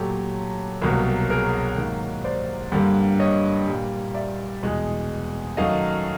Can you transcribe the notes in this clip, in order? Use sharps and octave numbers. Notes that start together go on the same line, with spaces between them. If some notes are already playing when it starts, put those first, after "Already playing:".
Already playing: A#2 F#3 A3 G4 A4
C2 B2 F#3 A#3
G#4 A#4
G#2 D#3 F#3 A#3
C5 D5
G2 D3 G3 A#3
C#5 D#5
A#2 G3 A#3
D5 E5
E2 B2 G#3
F#2 D#3 F#3 A3 D#5 F5